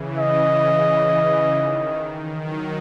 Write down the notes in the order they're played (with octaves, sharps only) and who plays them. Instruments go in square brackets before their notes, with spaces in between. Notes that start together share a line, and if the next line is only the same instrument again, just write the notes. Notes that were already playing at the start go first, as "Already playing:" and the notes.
Already playing: [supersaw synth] C#3 E3
[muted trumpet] D#5
[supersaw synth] D#3
D#3
D#3 F#3